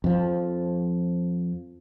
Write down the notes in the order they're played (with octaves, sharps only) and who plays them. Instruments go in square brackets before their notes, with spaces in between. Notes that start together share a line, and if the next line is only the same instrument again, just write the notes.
[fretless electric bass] F2 F3